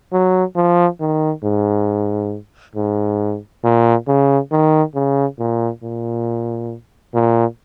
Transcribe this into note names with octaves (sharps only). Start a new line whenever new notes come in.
F#3
F3
D#3
G#2
G#2
A#2
C#3
D#3
C#3
A#2
A#2
A#2